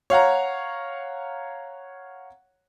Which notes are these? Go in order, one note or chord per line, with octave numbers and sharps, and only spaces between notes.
C#5 F5 F#5 A#5